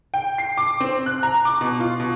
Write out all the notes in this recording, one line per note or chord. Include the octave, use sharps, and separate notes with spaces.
G5
C7
D6
C4
F#6
A#5
D6
B2
F4
B2